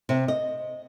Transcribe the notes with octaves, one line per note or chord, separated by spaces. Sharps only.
C3
D#5